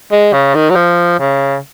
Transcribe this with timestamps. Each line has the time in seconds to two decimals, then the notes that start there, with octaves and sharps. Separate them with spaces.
0.12 G#3
0.33 C#3
0.54 D#3
0.70 F#3
0.75 F3
1.19 C#3